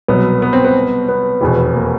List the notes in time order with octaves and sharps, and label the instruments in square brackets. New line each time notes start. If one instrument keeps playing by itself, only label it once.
[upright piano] C2 B2 F#3 [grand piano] B3
[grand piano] B3
C4
B3
B3
[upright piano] F1 E2 B2
[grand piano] A#3